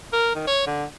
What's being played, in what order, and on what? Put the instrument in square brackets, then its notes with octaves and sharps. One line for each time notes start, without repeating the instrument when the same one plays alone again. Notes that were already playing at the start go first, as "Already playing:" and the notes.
[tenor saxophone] A#4
D#3
C#5
D3